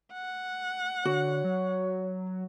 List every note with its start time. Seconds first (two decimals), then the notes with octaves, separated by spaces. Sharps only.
0.13 F#5
1.05 D3 F#4 C#5
1.44 F#3